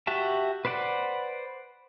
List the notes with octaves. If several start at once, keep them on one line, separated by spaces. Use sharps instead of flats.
F#4 G4 E5 A5
B4 C5 D5 F#5 B5